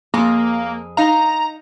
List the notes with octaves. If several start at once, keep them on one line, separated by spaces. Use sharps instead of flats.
F2 A#3 G#4
D#4 D#5 F5 A#5